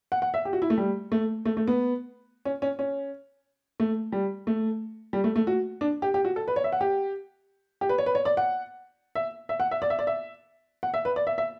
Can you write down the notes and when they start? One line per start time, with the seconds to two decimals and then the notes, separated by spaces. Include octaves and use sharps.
0.12 F#5
0.22 F#5
0.34 E5
0.45 G4
0.53 F#4
0.62 E4
0.70 A3
0.78 G3
1.12 A3
1.45 A3
1.57 A3
1.68 B3
2.45 C#4
2.62 C#4
2.79 C#4
3.80 A3
4.12 G3
4.47 A3
5.13 G3
5.24 A3
5.36 A3
5.47 F#4
5.81 D4
6.02 G4
6.14 G4
6.25 F#4
6.36 A4
6.48 B4
6.56 C#5
6.64 E5
6.72 F#5
6.81 G4
7.81 G4
7.89 B4
7.98 C#5
8.06 B4
8.15 C#5
8.25 D5
8.37 F#5
9.15 E5
9.49 E5
9.60 F#5
9.71 E5
9.82 D5
9.90 E5
9.99 D5
10.07 E5
10.83 F#5
10.94 E5
11.05 B4
11.16 D5
11.27 E5
11.38 E5